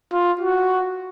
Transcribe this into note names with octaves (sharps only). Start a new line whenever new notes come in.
F4
F#4